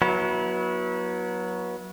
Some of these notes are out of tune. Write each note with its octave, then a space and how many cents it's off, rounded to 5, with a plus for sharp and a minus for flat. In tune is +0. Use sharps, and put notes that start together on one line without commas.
F#3 +0 B3 -30 E4 -25